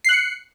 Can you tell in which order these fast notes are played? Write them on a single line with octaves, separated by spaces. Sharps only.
C7 F#6 C#7